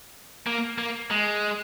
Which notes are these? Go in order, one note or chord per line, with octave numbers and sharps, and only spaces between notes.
A#3
A#3
G#3